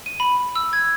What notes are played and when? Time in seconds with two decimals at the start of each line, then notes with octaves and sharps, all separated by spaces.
0.06 D#7
0.20 B5
0.55 E6
0.73 G#6